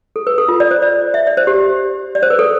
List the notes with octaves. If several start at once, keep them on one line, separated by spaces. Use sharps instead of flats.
A4
B4
A4
F4
D5
C5
D5
E5
D5
C5
G4
D5
C5
B4
A4